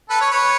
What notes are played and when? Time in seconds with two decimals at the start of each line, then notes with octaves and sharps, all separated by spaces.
0.10 A4 B4
0.21 B4 C#5
0.31 B4 C#5